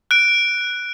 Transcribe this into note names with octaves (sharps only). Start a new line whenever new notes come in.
F#6 D7